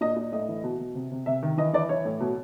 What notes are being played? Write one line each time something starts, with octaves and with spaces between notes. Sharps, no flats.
A#2 D#5
A#2
A2 D#5
E3
B2
B2
C3
C3
C3 E5
D#3
E3 D#5
E3 D5
E3 C#5
A2
B2